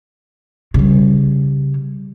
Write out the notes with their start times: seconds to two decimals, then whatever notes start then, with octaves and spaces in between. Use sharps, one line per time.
0.74 C#3 G3